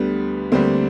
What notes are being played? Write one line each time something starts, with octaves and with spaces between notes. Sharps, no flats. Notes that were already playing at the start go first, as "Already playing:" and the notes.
Already playing: D2 D3 G3 B3
D2 D3 G3 A#3 C4